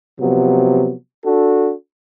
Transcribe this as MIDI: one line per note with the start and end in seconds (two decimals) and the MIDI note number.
0.20 0.93 48
0.20 0.93 53
0.20 0.93 54
0.20 0.93 59
1.25 1.72 62
1.25 1.72 66
1.25 1.72 69